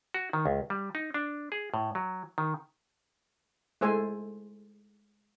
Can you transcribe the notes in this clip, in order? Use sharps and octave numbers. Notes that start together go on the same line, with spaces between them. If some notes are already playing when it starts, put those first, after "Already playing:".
F#4
D#3
C#2
G3
D#4
D4
G#4
A2
F#3
D#3
G#3 A3 A4 C5 E5 G#5